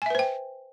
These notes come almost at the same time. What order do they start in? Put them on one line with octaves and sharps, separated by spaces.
G#5 E5 B4 C5 G5